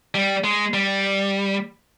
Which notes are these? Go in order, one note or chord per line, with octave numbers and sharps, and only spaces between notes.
G3
G#3
G3